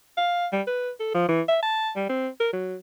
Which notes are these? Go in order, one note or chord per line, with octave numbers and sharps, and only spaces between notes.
F5
G3
B4
A4
F3
E3
E5
A5
G3
C4
A#4
F#3